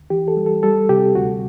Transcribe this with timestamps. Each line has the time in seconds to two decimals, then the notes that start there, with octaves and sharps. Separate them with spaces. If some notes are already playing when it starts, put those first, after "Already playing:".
Already playing: D2
0.10 E3 G4
0.28 A4
0.37 G3
0.46 A4
0.63 G3 A4
0.89 C3 G4
1.15 D2 F#4